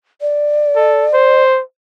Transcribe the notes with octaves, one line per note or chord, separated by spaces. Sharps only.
D5
A4
C5